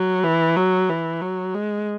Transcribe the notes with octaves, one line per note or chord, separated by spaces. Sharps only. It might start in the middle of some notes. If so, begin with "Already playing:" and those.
Already playing: F#3
E3
F#3
E3
F#3
G#3